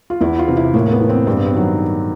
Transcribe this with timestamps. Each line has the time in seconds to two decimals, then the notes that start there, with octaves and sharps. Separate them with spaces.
0.10 F4
0.21 E2 E4
0.39 F4
0.48 C3 E3
0.57 E4
0.74 A2 A#3
0.86 A#3
0.92 B3
1.01 E3
1.09 C4
1.27 G2 C4
1.37 B3
1.46 C4
1.54 D#3 F#3